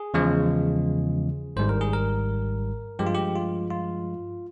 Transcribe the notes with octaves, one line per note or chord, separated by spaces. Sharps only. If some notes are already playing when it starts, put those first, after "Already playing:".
Already playing: G#4
E2 C#3 F3 G#3
G#1 G#2 G3 C5
A#4
G#4
A#4
G2 F3 G#3 G4
F4
G4
F4
F4